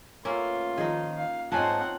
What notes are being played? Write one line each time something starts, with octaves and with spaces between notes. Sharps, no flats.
A3 A#3 C#4 F4 B4
D#3 F3 D#4 G#4
F5
G#2 F3 C4 C#4 D#4 F#5 G#5 A5